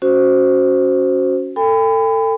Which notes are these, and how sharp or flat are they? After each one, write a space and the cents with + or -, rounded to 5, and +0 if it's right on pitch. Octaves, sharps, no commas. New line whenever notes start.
C#4 +0 F#4 +0 C5 +0
A4 +25 G5 +40 B5 +30